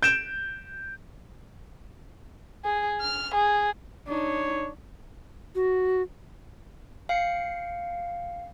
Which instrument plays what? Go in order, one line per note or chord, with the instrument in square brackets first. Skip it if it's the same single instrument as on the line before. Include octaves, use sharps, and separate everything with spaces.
[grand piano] G6 D7 E7
[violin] G#4
F6
G#4
[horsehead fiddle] D4 D#4 [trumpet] C#5
[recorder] F#4
[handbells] F5 G5 C7 C#7